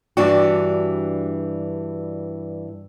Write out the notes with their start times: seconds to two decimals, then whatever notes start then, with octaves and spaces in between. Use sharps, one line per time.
0.17 G2 E3 D4 F#4